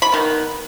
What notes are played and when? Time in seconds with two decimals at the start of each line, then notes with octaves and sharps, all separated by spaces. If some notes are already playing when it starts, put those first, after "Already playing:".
0.02 B5
0.12 D#3 B3